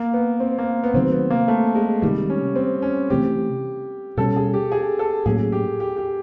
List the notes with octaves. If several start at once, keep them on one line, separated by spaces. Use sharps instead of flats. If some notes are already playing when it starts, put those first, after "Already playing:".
Already playing: A#3
B3
C4
A#3
B3
C3 D#3 F#3 A3 C4
B3
A#3
A3
G#3
C3 D#3 G3 G#3
C#4
C4
C#4
C3 E3 A3 C4 G4
B2 G3 A#3 C#4 A4
G#4
G4
G#4
A4
A2 F#3 A#3 C#4 G#4
G4
G4
G4